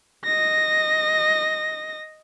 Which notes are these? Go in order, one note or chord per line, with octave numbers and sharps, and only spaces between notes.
D#5 A#6